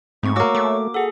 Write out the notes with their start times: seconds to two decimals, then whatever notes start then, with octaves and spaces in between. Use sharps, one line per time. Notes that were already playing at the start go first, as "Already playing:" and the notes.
0.23 G#2 A3 C4 C#6
0.36 A#3 F#4 C#5 C#6 D6 E6
0.55 A3 D6
0.94 G#4 A4 F#5